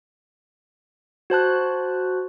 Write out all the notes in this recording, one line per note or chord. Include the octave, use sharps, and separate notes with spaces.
F#4 C5 A5 F#6